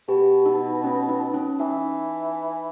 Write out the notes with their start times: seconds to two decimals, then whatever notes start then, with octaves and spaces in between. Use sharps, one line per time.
0.08 B2 G4
0.46 D#4
0.84 C#4
1.09 D#4
1.34 C#4
1.60 E3 D#4